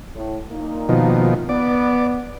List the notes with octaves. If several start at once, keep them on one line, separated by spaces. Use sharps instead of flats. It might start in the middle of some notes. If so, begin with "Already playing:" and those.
A2
A#2 A#3 D#4
B2 D#3 F3
B3 D5